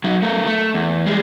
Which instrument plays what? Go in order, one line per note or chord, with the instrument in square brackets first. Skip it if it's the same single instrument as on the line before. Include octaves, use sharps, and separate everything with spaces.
[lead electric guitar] F#3 D#4
A3 A#4
A3
E2
G3 G#3